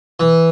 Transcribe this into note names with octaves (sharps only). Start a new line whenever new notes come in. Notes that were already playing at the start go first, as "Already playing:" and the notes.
E3